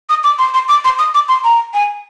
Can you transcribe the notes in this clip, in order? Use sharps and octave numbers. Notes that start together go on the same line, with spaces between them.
D#6
D6
C6
C6
D6
C6
D#6
D6
C6
A#5
G#5